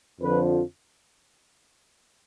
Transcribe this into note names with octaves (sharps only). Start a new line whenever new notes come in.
F2 D3 F3 B4